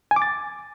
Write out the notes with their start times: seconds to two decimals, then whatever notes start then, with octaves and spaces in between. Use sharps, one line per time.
0.11 G#5
0.16 D6
0.22 A6